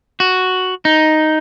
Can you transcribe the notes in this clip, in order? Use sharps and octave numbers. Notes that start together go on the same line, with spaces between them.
F#4
D#4